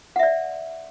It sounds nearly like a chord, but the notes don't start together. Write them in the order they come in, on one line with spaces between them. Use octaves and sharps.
F#5 E5 D5